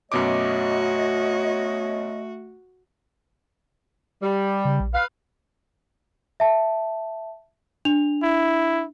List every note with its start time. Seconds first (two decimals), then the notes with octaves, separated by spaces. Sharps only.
0.12 F#2 B2 A3 F#4 C#5 D#5 D6
4.22 G3
4.65 C#3
4.80 A#1
4.94 B4 F5
6.40 E5 A5
7.85 D4 F7
8.23 E4